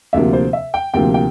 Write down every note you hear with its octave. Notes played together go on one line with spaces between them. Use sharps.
D2 C3 F3 A#3 E5
C5
E5
G5
D2 C3 F3 A#3 G5
G5